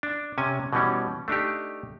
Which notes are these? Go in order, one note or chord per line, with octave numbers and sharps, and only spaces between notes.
D4
C3 C#4 G#5
B2 E3 G3 C#4
A3 D4 D#4 G4